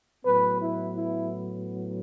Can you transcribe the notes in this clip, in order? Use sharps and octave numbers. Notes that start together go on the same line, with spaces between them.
A2 F#3 B3 B4
E4
E4